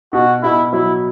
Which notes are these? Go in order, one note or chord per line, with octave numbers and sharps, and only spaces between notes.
B2 F#4
B2 E4
F#3 E4